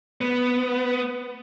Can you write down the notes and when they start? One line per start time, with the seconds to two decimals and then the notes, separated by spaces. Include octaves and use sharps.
0.21 B3